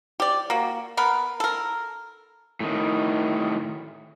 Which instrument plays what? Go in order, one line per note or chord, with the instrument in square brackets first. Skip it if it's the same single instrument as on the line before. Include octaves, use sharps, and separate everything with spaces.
[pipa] G4 D5
A#3 F#4
B3 A#4 B4
A4 A#4
[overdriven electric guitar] A2 D#3